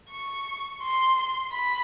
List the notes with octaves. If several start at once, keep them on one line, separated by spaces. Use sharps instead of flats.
C#6
C6
B5